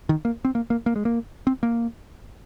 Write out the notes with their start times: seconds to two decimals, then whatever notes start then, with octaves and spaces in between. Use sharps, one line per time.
0.09 D#3
0.25 A#3
0.45 C4
0.55 A#3
0.70 A#3
0.86 A#3
0.96 G#3
1.05 A#3
1.47 C4
1.63 A#3